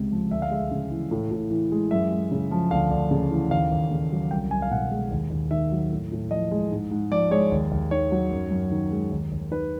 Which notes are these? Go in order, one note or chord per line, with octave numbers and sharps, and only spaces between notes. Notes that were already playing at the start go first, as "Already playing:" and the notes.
Already playing: C#2 C3 G#3
F3
D2 E5
F5
G#3 E5
C#3
E3
A2
A2
E3
G#3
F#2 E5
G#3
C#3
F3
D2 F5
D2
C#3
E3
D#2 F5
D#2
C#3
F#3
C2 G5
C2 G#5
F5
B2 F#5
G#3
D#2
D#2
D#3 E5
F#3
A2
A2
F3 D#5
G#3
G#2
G#2
F3 D5
G#3 C#5
D#2
D#2
D#3 C#5
F#3
F#2
F#2
D#3
G#3
D#2
D#2
D#3 B4